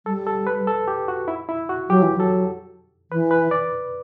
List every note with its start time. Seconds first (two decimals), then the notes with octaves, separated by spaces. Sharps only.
0.06 G3 A4
0.27 A4
0.47 B4
0.67 A4
0.88 G4
1.08 F#4
1.28 E4
1.49 E4
1.69 F#4
1.89 F#3 G4
2.02 E3
2.16 F#3 A4
3.11 E3 B4
3.31 B4
3.51 D5